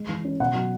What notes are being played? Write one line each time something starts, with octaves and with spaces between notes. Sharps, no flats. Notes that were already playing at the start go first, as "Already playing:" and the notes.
Already playing: G#3
E3
C#4
B2 F#5
F#3